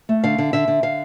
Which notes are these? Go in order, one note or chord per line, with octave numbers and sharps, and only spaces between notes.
A3
D3 F5
D3
D3 E5
D3
D3 F5